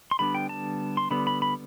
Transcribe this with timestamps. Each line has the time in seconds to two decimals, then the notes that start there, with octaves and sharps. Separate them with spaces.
0.11 C6
0.19 D3 G3 B3 D4 B5
0.35 G5
0.49 A5
0.97 C6
1.11 D3 G3 B3 B5
1.27 B5
1.42 B5